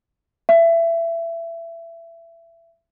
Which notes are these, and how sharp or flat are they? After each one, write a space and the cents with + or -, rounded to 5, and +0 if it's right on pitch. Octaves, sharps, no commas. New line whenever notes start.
E5 +25